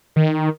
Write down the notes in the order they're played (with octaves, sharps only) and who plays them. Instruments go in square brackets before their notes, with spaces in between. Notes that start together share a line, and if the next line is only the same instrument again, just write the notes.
[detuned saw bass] D#3